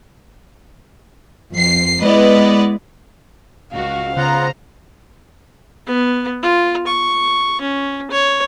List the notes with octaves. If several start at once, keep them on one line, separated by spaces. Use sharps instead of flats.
F2 C7
G#3 B3 E4 B4 D5 D#5
C#2 F#4 F5
C#3 B3 F4 C5 F#5 A#5
B3
F4
C#6
C#4
C#5